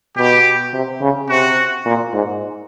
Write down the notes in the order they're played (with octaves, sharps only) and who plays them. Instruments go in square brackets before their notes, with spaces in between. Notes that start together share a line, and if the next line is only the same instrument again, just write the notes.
[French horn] B2 [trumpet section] G4
[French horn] C3
C#3
[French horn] C3 [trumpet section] F#4
[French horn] A#2
G#2